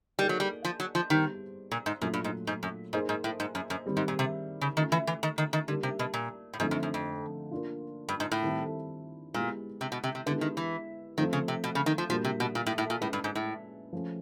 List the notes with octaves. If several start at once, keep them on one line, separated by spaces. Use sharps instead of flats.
G3 A#3 D#4 G#4
F#3
G3
F3
F#3
F3
D#3 G3 B3 D#4 G4 C5
A#2
G#2
F#2 A#2 F#3 A3 D4 F4
G2
G#2
G#2
F#2
G#2 A#3 D#4 G#4 C5
G#2
A2
G#2
F#2
F#2
D#3 G3 C4
G#2
A#2
C3
C#3
D#3 A3 C#4 F4
E3
E3
D#3
D#3
D#3
D3 G3 A#3 D#4 G4
C3
B2
A#2
A2
G#2 D3 F3 A3 C4 D#4
F#2
F#2
F2
A#3 D4 F4
G2
G#2
A2
D#3 G3 C4 E4
A#2 G#3 B3 E4 G4
C3
B2
C3
C3
D3 G#3 B3 E4 G4 B4
D#3
E3
D#3 F3 A3 C4
C#3
C3
B2
C#3
D#3
F3
A#2 F3 G3 A#3 D4 F#4
C3
B2
A#2
A2
A2
A#2
A2 G#3 C#4 E4 G#4 B4
G2
G#2
A2
F3 A3 C#4